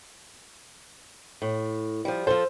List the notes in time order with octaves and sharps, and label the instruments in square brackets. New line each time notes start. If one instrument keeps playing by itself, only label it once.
[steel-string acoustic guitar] A2
F3 G3
[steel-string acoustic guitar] F3 A4 [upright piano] C5